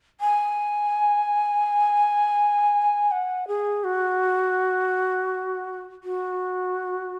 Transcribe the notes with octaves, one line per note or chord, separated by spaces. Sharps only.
G#5
F#5
G#4
F#4
F#4